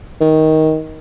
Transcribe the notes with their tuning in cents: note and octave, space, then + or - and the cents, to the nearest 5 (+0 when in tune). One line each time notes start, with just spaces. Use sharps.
D#3 +15